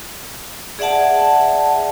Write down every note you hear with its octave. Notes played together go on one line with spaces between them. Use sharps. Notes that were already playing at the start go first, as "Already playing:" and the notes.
G#4 D5 E5 F#5 A5